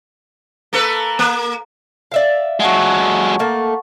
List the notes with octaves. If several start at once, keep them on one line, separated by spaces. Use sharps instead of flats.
A#3 A4 B4
A#3
D5 E5 F5
F#3 G#3 F#5 A5 C#6
A3 A#3